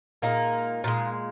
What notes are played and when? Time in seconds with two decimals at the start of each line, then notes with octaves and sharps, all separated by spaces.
0.22 A#2 G#3 A#3 D#4
0.84 A#2 G#3